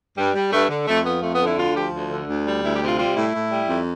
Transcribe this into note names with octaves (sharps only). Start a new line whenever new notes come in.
G2 G3
G3
G2 A3
D3
F2 A3
F3 B3
F2 A3
B3
D3
E4
D2 F4
F3 G4
D2
D3
D2
G3
D2 E4
G4
C3
F4
G3 F4
A2 E4
A2
G3
F2